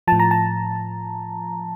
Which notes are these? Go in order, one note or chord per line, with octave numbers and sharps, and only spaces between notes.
A2 F3 A5
A#5
A5